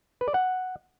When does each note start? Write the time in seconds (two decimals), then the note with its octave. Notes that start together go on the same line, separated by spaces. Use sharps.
0.21 B4
0.28 D5
0.34 F#5